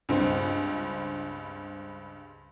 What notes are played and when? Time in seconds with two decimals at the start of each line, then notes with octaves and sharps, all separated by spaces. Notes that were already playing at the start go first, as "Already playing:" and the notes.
0.09 C#2 G2 C4